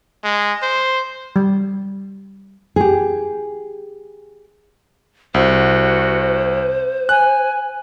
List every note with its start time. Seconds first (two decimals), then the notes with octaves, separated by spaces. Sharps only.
0.24 G#3
0.62 C5
1.36 G3
2.76 G4 G#4
5.34 C2 F#4 C5
7.09 G#5 F#6